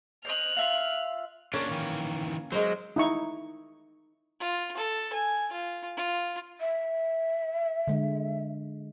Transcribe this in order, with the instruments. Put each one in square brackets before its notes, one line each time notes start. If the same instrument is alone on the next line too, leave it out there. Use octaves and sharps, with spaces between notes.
[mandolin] C5 D5 D#5 [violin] F6 F#6
[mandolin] F4 E5 F5
[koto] A#3 C#4 [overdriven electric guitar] D4 F4
[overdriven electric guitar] D#3 E3
[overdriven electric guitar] F#3 [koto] G#3 A#4 C5
[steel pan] D#4 E4 C#6
[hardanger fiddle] F4
A4
G#5
F4
F4
[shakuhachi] E5
[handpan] D3 G#3